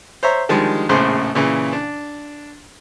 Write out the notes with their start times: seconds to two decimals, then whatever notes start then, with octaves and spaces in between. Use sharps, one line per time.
0.23 C5 C#5 E5 A#5
0.49 D3 D#3 F3 G3 G#3
0.89 A#1 E2 A2 C#3 C5 C6
1.35 A#2 C#3 E3
1.73 D4